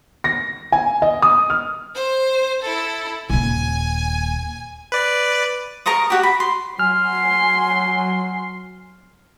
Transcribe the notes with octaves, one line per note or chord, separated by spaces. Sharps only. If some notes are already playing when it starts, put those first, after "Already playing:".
A#6
G#5
D#5
D#6
F6
C5
E4 A4
D#1 D#2 G#5
B4 D5
A#4 A#5 C#6 D#6
F#4 G4
B5
C6
F#3 G#5 C6 F6